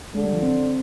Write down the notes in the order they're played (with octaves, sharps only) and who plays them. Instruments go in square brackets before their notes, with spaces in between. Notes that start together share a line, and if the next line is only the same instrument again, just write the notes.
[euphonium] D3 [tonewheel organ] G#3
[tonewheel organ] G3
F3
C4